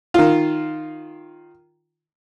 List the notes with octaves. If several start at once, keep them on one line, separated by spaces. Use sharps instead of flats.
D#3 F4